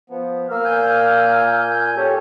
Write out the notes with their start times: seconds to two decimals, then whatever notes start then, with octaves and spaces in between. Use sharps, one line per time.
0.10 F3 B3
0.51 A#3 E6 F6
0.65 A#2 G#5 G6
1.97 C#4 G4 A4